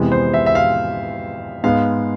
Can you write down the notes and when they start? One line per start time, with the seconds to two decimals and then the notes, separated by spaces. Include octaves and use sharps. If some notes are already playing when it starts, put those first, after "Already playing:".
Already playing: F2 C3 E3 G#3 B3
0.12 C5
0.34 E5
0.46 E5
0.55 F5
1.64 G#2 G#3 B3 F5